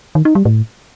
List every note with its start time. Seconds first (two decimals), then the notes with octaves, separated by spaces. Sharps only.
0.15 D#3
0.25 D#4
0.35 G3
0.45 A2